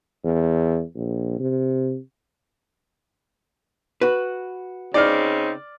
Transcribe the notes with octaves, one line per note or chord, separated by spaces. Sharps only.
E2
A#1
C3
F#4 B4
C#3 C4 D#4 D5 F6